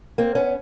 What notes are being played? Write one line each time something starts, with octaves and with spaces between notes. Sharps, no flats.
A#3 C4
B3 C#4